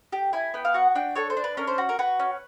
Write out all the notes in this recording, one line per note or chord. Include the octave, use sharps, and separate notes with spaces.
G4
E4 G#5
B3 G5
F5
F#4 F#5
D4 G5
A4 C#5
C5
D4
B4
C#4 A#4
C5
F#4
A#4
F#4 B4
C#4